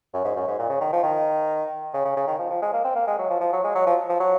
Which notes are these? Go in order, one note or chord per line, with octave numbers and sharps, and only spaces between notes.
F#2
G#2
F#2
G#2
A#2
C#3
D#3
F3
D#3
C#3
C#3
C#3
D#3
F3
F3
G#3
A#3
C4
A#3
G#3
F#3
F3
F3
F#3
G#3
F#3
F3
F3
F#3